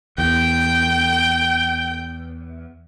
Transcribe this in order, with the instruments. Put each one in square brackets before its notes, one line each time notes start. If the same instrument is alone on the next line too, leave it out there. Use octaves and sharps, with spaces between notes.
[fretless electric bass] E2 [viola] G5